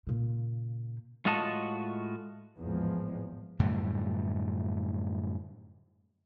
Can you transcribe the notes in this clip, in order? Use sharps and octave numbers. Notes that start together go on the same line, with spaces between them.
A#2 C#3
A2 G#3 F4 F#4 D#5 A5
G#1 E2 A2 F3 G#3
F#2 A2 D3 G3